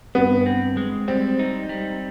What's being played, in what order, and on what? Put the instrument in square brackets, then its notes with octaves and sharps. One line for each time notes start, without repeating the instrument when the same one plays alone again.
[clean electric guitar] G2 [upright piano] B3
[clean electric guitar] C4
G#3
[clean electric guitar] G3 [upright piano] C4
[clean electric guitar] D#4
G3